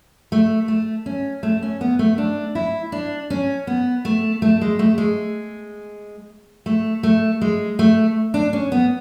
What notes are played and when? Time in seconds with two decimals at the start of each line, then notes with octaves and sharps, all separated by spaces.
0.32 A3
0.68 A3
1.06 C#4
1.43 A3
1.62 C#4
1.81 B3
1.99 A3
2.18 D4
2.55 E4
2.92 D4
3.30 C#4
3.67 B3
4.05 A3
4.42 A3
4.61 G#3
4.79 A3
4.98 G#3
6.66 A3
7.03 A3
7.41 G#3
7.79 A3
8.34 D4
8.53 C#4
8.72 B3